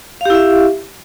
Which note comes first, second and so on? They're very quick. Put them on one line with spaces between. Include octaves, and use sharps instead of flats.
F5 G4 E4 E5